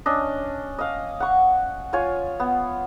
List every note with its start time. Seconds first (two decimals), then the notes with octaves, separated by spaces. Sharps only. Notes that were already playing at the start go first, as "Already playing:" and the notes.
0.06 C#4 D4 D#5
0.78 D#5 F5
1.20 F#5 C#6
1.93 F4 C#5 G#5
2.40 B3